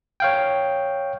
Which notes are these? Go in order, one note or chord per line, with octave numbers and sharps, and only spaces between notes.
C#5 F5 G5